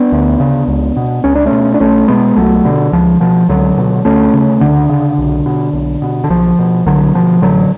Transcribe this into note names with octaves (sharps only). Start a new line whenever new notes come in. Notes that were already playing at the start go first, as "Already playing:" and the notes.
Already playing: B3 D4
D2
C#3
C#2
B2
C#2 C#4
D4
A3 C#4
B2
D4
B1 A3 C#4
B2 G#3 B3
B1 F#3 A3
B2 D3
C#2 F3
B2 F3
C#2 D3 F#3
B2
D2 A3 C#4
C#3
D2 D3
C#3
B1
B2
B1
B2
D3
B1 F3
B2
B1 D3 F#3
B2 F3
A1 D3 F#3